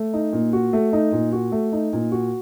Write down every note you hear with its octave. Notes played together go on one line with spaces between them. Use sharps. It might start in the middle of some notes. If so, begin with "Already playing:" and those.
Already playing: A3
D#4
A#2
F#4
A3
D#4
A#2
F#4
A3
D#4
A#2
F#4